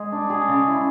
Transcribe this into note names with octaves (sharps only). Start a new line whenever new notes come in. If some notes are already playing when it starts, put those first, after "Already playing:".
Already playing: G#3 G#4
D4
G#4
C#3
E4